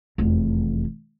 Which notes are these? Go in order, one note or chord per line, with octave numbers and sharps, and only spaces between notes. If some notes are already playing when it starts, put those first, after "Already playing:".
F1 E2